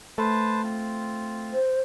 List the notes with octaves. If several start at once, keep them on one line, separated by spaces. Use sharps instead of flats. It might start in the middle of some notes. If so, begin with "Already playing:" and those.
A3 B4 C5 A5
C4 F4
C5